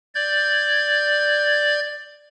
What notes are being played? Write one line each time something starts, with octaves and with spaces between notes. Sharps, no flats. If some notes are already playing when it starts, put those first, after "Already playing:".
D5 G6 G#6